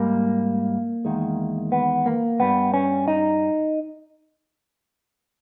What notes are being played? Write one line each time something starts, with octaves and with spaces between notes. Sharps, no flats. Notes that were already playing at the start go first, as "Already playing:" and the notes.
Already playing: G#2 G3 A#3
E2 D#3 G#3
B3
A#3
G2 G3 B3
C#4
D#4